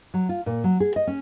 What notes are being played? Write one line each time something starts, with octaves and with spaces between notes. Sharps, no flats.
F#3
F4
A#2
F#3
G#4
D#5
C#4